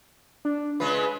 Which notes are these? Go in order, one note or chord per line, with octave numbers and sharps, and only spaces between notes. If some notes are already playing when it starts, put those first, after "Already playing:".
D4
C#3 G#3 F4 B4